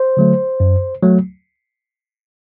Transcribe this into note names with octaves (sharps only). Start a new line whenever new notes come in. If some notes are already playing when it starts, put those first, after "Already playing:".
Already playing: C5
D3 F#3 A3
F#2
F#3 A3